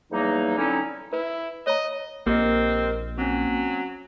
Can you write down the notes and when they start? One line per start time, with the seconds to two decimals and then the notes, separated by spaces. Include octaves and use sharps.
0.11 E2 F#3 G3 A#3 D#4
0.57 D3 F#3 C4 C#4 D#4 E4
1.13 E4 B4
1.67 C#5 D#5 A#5
2.27 A#1 A#3 C4 G4 A#4 D#5
3.18 F#3 C4 C#4